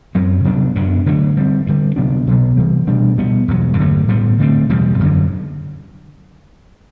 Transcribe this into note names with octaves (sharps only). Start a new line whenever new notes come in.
F#2 F#3 C4
C3 F#3 B3 D4
F#2 F#3 B3 D4
D3 F#3 A3 D4
D3 G3 C4
G2 D3 G3
C3 F#3 B3 D4
B2 F#3 B3
C3 E3 G3
B2 G3 D4
B2 G3 B3
E2 B2 F#3
G2 D3 F#3 A3
A2 G3 B3
D3 A3 C4
E2 B2 G3
F#2 D3 F#3